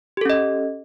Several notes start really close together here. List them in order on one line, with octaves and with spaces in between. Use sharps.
G4 A4 C#4 D#5